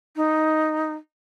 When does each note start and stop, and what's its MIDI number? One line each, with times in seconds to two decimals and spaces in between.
0.16 0.93 63